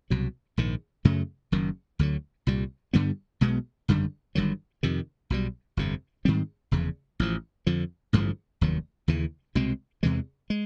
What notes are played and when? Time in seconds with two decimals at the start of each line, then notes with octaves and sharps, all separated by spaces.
0.10 C2 B2 F#3
0.57 A#1 G#2 D#3
1.05 F#2 C#3 F#3 A3
1.52 F#1 F#2 D#3
1.99 D2 D3 F#3
2.47 C2 A#2 G3
2.93 G2 D3 G3 B3
3.41 B1 B2 G#3 B3
3.88 G#1 F#2 D3 G3
4.35 G1 G2 D#3 F#3
4.83 F2 C3 D#3
5.30 B1 B2 G3
5.77 G1 F2 C3
6.25 G#2 D#3 G3 C4
6.71 F1 E2 C#3
7.20 A1 A2 F3
7.66 F2 D3 F3
8.13 A1 G2 D3 F3
8.61 F1 D#2 D#3 F#3
9.08 D#2 C#3 E3
9.55 C2 B2 G#3 C4
10.03 E2 C3 E3 G#3
10.50 G#3